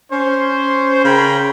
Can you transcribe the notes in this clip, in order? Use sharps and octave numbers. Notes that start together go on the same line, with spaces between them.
C#4 C5
C#3 A#4 G5 A#5 B5